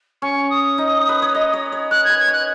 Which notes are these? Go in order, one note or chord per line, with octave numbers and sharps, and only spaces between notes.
C#4 C#6
D#6
D#4
B4
C#5
D#5
C#5
C#5
C#5 F#6
G#6
B4
G#6
C#5 F#6